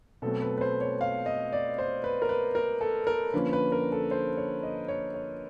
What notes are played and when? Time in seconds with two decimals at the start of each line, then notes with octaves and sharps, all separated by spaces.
0.22 B2 F#3 A3 C4 A4
0.42 B4
0.58 B4
0.61 C5
0.81 C#5
1.01 F5
1.26 D#5
1.53 D5
1.78 C5
2.04 B4
2.22 A#4
2.29 B4
2.55 A#4
2.81 A4
3.07 A#4
3.33 D3 F3 A#3 C#4 B4
3.53 B4
3.72 A#4
3.92 A4
4.11 C5
4.37 C#5
4.63 D#5
4.88 C#5
5.14 C#5